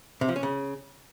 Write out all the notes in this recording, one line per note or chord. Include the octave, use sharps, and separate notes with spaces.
C3
F3
C#4
C#3